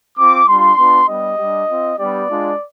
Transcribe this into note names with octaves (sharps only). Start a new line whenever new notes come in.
C4 F4 D6
G3 D4 F4 C6
B3 D4 F4
G3 B3 D4 G4 D#5
G3 D4 G4
C4 F4
G3 B3 D4 G4 D5
G#3 D4 F4